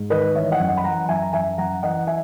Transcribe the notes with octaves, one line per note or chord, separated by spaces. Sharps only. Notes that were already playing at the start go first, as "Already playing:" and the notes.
Already playing: G#2
D#3 B4 D#5
E3 C#5 E5
D#5 F#5
F#2
D#5 F#5
B5
E3 F#5 A#5
F#2 E5 G#5
A#5
F#2 E5 G#5
F#2 F#5 A#5
E3 D#5 F#5
E5 G#5